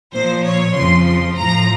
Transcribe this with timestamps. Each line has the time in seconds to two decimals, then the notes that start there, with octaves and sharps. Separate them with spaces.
0.13 A#2 F3 C5
0.44 C#5
0.75 F2 C#3 F3 C6
1.06 C6
1.37 A2 F3 A#5